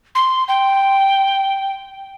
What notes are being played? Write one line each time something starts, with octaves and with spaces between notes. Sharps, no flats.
C6
G5